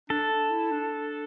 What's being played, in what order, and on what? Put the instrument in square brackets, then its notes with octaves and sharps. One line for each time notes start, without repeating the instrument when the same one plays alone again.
[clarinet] D4 [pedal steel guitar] A4
[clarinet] D4
E4
D4